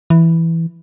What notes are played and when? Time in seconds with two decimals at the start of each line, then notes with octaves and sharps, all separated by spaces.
0.10 E3